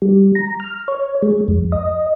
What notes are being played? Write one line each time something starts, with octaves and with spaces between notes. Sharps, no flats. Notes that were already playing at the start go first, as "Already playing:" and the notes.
G3
A#5
F6
C#5
G#3
F2
D#5